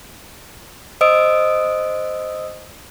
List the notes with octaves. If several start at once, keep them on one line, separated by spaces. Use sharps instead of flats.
C5 D#5 D#6 E6 D7